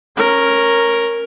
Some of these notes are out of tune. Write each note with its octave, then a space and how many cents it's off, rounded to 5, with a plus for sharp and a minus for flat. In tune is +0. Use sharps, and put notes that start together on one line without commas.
C#4 -10 A#4 +0